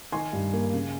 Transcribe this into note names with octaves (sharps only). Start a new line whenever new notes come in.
D#3 G#5 C6
G2
A#3
C#3